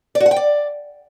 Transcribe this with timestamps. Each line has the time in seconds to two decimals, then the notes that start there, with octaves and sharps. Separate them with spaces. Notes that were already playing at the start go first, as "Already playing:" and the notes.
0.15 D5
0.20 F#4
0.26 F#5
0.31 G5
0.36 D5